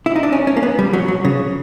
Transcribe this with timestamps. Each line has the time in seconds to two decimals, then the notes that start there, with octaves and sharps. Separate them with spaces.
0.06 E4
0.16 D#4
0.23 D4
0.32 C#4
0.47 C#4
0.57 A#3
0.63 B3
0.79 G3
0.93 F#3
1.08 F#3
1.25 C#3